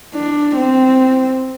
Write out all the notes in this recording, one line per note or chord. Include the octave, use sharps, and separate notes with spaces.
D4
C4